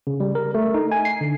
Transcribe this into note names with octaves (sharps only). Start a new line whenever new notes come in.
C#3
G3
A#4
A3
D#4
G#5
C7
D3